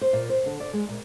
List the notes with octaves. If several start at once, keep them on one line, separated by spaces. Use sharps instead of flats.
C5
A#2
C5
D3
D5
G#3
A#2